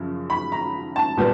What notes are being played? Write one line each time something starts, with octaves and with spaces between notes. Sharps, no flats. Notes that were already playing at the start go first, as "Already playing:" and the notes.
Already playing: F#2 C#3 F3
B5
A#5
A5
A#2 G3 B3